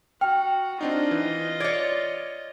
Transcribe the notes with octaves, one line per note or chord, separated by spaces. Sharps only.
F#4 G5 F6
C4 D4 D#4 F4 D#5
E3
C#5 D5 G#6